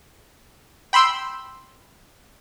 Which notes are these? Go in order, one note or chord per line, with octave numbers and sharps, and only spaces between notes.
G5 B5 C6 E6